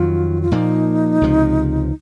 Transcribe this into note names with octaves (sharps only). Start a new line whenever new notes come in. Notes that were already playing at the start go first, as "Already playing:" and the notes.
Already playing: F2 D#3 F#3 F4
F4
A#2 F3 A#3 D#4
C#2 C3 F3